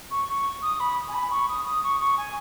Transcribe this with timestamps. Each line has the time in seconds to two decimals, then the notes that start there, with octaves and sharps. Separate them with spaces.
0.11 C#6
0.29 C#6
0.62 D#6
0.80 B5
1.08 G#5
1.14 B5
1.31 C#6
1.49 D#6
1.65 D#6
1.83 C#6
2.00 C#6
2.18 G#5